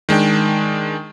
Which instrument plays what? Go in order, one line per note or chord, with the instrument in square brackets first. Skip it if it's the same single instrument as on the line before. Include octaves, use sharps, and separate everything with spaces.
[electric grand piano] D#3 G#3 D4 G5